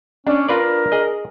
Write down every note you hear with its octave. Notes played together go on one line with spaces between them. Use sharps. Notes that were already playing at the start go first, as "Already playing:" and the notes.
C#4 D4
F4 A#4 B4 D5
G#4 D#5